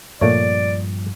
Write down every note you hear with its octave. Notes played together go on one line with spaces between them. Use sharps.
G2 A#2 F3 A3 C#5 D5